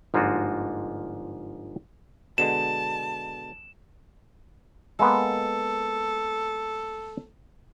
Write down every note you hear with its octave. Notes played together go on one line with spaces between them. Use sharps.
G1 G#2 F3 A#3 F4 F#4
B2 D3 G#3 A5 E7
G#3 A#3 B3 A4